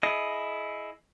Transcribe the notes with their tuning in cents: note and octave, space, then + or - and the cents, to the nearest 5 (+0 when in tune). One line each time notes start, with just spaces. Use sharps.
E4 +0 G#4 +30 D#5 +0